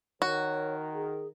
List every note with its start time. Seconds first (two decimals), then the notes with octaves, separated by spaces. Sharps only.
0.22 D#3 F#4 A#4 C#5
0.94 G#4